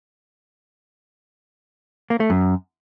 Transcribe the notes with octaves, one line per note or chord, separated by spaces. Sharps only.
A#3
A3
F#2